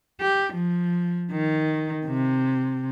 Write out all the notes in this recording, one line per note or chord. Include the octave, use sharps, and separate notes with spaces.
G4
F3
D#3
C3